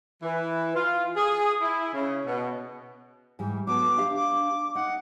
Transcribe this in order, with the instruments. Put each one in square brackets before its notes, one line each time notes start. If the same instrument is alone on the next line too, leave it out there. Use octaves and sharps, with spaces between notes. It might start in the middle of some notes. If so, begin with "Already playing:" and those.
[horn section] E3
F4
G#4
E4
C#3
B2
[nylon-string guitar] G#2 E3 G3
[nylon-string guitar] F#3 B3 A4 [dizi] D6
[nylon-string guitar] D4 G4 F5
[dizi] D6
[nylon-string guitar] D#4 [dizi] F#5